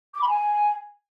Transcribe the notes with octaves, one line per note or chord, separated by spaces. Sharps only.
D6
B5
G#5